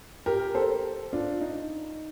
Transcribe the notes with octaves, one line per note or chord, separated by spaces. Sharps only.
G4 A#4
A4 C5
D4 F4
D#4